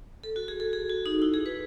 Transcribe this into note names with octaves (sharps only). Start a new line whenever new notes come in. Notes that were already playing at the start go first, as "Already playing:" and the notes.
A4
F#4
G#4
A4
G#4
F#4
D#4
E4
G#4
B4